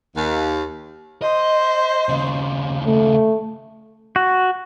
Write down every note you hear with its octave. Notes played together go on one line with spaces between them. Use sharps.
D#2
C5 D#5
D#2 C#3
A3
F#4